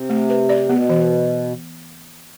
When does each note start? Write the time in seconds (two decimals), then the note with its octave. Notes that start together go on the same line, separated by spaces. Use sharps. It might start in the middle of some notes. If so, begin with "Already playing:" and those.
Already playing: C3
0.09 A3
0.30 B4
0.49 D5
0.69 B2 B3
0.90 E3